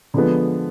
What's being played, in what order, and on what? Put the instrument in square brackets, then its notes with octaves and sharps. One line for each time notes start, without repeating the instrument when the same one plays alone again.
[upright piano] D3 F3 G#3 B3